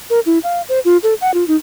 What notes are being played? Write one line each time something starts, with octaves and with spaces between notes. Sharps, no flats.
A#4
E4
F5
C5
F4
A4
F#5
F4
D#4